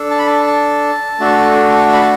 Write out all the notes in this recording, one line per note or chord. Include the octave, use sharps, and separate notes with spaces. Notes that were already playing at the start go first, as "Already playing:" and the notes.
Already playing: D4 A4
A5
B5
A5
A5
A3 D4 F#4 A4
B5
A5